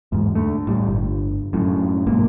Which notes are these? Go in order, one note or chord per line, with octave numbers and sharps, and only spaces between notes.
E2 G#2
D2 A3
A2 G3
G1
F#2 A2
B1 G#2 A#3